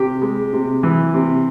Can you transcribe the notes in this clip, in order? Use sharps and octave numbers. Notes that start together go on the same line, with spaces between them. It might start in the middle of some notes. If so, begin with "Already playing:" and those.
Already playing: C3 G4
G#3
C3
E3
C3